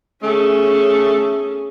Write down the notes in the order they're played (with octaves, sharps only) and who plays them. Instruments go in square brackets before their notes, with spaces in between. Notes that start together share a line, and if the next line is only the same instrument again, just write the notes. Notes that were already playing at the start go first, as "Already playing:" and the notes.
[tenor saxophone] A3 [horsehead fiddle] C#4 G#4